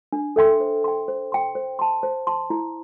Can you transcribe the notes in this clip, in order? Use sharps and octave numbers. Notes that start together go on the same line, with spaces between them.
D4
A4 E5 G5 C6
C5
G5 C6
C5
G5 C6
C5
A5 C6
C5
A5 C6
E4